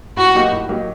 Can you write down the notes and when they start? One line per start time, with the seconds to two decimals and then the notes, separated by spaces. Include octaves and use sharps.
0.17 A2 F#4
0.35 F#3 A#3 D#4 G4
0.52 A2
0.69 F#3 A#3 D#4 G4